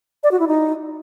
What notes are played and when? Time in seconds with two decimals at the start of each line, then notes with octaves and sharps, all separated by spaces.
0.23 D5
0.31 F#4
0.39 E4
0.47 D#4